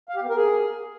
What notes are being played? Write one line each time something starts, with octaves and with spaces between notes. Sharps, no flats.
F5
G4
B3
A#4
G#4